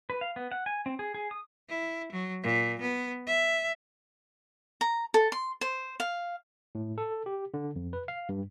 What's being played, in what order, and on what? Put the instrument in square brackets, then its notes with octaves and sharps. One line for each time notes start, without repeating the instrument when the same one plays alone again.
[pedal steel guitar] B4
F5
B3
F#5
G#5
C4
G#4
G#4
D#6
[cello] E4
F#3
A#2
B3
E5
[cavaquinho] A#5
A4
C6
C5
F5
[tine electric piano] A2
A4
G4
D3
F2
B4
F5
G2